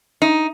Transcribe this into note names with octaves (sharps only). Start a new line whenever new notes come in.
D#4